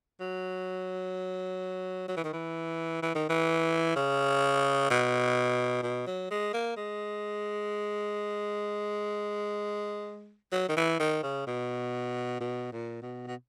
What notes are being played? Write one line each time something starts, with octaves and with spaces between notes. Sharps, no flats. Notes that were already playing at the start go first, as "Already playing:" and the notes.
F#3
F#3
E3
D#3
E3
E3
D#3
E3
C#3
B2
B2
F#3
G#3
A#3
G#3
F#3
D#3
E3
D#3
C#3
B2
B2
A#2
B2
B2